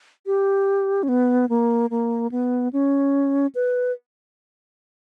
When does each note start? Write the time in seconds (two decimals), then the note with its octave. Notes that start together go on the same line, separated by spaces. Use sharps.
0.26 G4
1.03 C#4
1.09 B3
1.49 A#3
1.90 A#3
2.32 B3
2.73 C#4
3.55 B4